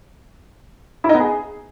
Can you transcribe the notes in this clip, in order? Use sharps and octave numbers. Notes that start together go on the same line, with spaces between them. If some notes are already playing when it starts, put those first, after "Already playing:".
E4
D#4
B3
G#4